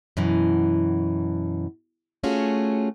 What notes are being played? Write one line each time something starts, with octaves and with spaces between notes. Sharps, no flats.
F#2 B2 E3
A3 C#4 F4 F#4 G#4